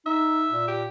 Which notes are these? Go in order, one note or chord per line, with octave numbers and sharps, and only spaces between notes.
D#4 E5
A#2
G4